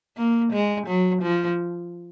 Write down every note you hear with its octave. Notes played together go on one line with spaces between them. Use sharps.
A#3
G#3
F#3
F3